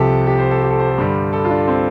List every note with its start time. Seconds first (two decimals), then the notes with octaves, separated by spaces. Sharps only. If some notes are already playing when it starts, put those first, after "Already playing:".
Already playing: C2 C3 F3 G4 A4
0.27 G4
0.39 C5
0.51 A4
0.62 G4
0.71 A4
0.79 C5
0.89 A4
0.98 G2 D3 G3
1.33 A4
1.44 F4
1.50 D4
1.68 C4